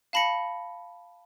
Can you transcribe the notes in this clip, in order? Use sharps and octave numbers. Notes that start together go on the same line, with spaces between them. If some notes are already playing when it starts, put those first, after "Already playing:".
F5 A5 B5 A#6 C#7